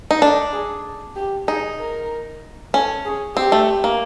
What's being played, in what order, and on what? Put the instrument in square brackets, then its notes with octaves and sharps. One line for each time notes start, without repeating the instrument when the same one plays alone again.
[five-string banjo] D#4
[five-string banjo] D4 [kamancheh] A4
[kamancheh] G#4
G4
[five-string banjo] D#4 [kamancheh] G#4
[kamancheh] A#4
[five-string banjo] C#4 [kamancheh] A4
[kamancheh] G#4
[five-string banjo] C4 [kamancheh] G4
[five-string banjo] A3
A#3